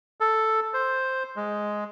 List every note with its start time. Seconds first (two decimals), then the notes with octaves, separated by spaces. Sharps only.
0.20 A4
0.74 C5
1.36 G#3